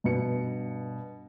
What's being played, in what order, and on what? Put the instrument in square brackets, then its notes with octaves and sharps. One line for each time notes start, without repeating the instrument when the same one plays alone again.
[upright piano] G2 B2 C#7